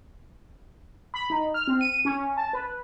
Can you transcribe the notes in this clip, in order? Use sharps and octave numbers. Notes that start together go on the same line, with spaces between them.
B5
D#4
F6
C4
D#7
C#4
A5
B4